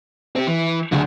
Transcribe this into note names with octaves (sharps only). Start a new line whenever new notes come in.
C4 G4
E3
D2 F#3 G#4